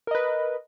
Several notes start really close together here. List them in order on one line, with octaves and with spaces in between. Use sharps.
A#4 D#5 B4